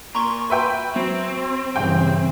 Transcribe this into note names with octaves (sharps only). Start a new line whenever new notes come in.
A#2 A#5 C6 C#6
B4 E5 G5
F#3 C4
G2 C#3 E3 G5